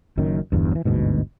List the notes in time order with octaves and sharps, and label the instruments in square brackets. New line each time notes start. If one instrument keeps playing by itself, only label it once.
[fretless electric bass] F#1 F#2 D#3
G1 E2 G2
E3 F#3
G1 D2 G#2 B2